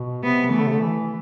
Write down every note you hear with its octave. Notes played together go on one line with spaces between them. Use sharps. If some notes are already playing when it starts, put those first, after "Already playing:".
Already playing: B2
C3 B3
E3 A3
D3
C3
D3
E3